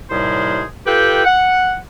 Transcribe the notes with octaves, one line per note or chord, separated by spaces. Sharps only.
D#2 A2 C3 G3 G#4 C5
F4 G4 A4 B4 G5
F#5